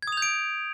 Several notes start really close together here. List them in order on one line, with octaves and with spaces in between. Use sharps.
G#6 D#6 F7 G6 D7